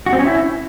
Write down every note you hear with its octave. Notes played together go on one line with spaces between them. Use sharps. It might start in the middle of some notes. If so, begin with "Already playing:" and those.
F#4
C4
C#4
E4